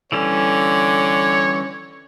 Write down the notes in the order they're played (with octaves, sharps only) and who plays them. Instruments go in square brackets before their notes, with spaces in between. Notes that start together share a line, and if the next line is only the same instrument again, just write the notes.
[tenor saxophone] D3 [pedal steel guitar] E3 G3 C#4 [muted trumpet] C#5